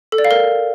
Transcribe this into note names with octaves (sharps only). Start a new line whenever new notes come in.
A4
D5
F5
A#4